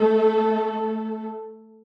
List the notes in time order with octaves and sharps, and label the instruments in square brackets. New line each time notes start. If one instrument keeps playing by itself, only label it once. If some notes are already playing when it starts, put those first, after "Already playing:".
Already playing: [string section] A3 A4